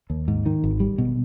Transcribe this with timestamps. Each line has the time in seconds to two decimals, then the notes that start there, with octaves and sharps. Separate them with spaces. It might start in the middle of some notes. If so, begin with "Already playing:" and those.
0.10 D#2
0.28 G#2
0.46 D#3
0.64 G#1
0.80 G3
0.98 B2